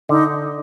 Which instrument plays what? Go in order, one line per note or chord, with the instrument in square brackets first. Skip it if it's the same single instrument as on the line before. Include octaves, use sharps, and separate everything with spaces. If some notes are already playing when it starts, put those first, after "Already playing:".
[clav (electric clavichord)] D3 [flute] D#4